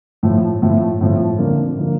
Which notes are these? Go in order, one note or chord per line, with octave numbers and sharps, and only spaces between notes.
A2 F3 A3
A2 F3 A3
A2 F3 A3
F2 D3 F3 A#3
D3 F3 A#3